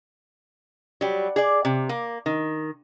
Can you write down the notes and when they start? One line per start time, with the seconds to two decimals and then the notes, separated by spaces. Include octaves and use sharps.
1.01 F#3 G3
1.36 G#4 D5
1.65 C3
1.89 A#3
2.26 D#3